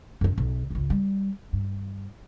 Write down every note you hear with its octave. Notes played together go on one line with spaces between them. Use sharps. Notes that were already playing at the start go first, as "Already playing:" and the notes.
F#2 C#4
B1
G#1 C#2
G3
G2